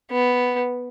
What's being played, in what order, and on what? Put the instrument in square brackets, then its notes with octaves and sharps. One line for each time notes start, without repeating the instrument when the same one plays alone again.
[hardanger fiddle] B3